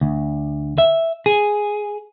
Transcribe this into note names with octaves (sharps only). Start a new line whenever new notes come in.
D2
E5
G#4